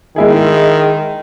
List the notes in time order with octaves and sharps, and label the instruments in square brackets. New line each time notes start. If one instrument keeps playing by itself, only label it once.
[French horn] D#3 [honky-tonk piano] G#3 E4 G#4